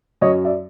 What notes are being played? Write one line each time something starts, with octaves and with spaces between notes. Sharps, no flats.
F#2 C#5 D#5
D5 E5